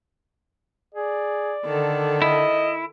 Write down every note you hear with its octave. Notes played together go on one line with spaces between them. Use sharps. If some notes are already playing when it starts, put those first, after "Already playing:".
G#4 D5
D3 D#3 A4
E4 D#5